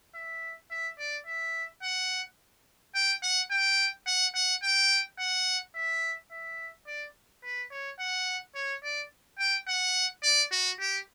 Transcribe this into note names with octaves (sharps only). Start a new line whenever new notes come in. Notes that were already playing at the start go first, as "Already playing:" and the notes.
E5
E5
D5
E5
F#5
G5
F#5
G5
F#5
F#5
G5
F#5
E5
E5
D5
B4
C#5
F#5
C#5
D5
G5
F#5
D5
F#4
G4